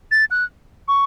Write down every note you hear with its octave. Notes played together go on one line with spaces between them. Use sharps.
A6
F#6
C#6